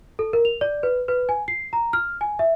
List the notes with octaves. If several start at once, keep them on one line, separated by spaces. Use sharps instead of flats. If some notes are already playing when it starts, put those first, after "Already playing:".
A4
A#4
F7
D5
B4
B4
G#5
C7
A#5
F6
G#5
E5